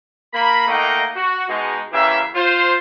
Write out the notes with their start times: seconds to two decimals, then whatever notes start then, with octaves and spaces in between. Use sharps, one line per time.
0.33 A#3 B5
0.68 A3 A#3 D#4 D#5 F#5 G5
1.15 F#4
1.49 B2 G#3 D#4
1.93 C#3 E3 A#3 G4 E5
2.35 F4 C5